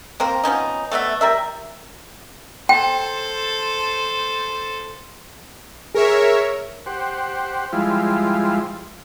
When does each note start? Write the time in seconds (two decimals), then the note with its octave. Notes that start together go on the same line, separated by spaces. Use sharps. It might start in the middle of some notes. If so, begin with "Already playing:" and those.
0.20 A#3 C4 A#4
0.44 F3 B3 C#4 D#4
0.92 A3 B3 D5 E5
1.21 G3 A#4 E5
2.69 A4 C5 G5
5.95 G#4 A#4 C#5 E5
6.86 G4 C5 F#5
7.73 F3 G3 G#3 E4 F4